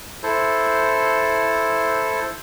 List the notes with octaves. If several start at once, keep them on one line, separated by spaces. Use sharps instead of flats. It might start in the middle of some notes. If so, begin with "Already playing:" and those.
E4 A4 C5